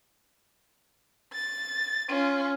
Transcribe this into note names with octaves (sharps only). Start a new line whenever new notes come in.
A6
C#4 F4